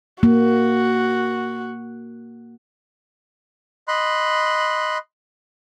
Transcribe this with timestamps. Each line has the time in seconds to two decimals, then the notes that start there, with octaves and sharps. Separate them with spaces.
0.23 A#3 F#4
3.88 D#5 B5 C6 F#6